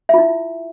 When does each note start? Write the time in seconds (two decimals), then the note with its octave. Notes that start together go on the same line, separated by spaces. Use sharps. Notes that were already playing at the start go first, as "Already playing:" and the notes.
0.09 E5
0.14 F4
0.18 E4